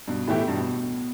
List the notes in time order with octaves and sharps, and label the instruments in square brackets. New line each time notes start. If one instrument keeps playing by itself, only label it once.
[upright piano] G2 [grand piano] B2
[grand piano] A2 [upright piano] E3 A3 E4 G4
[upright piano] G2 [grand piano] B2